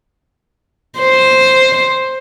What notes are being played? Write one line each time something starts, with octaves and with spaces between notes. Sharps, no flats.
C5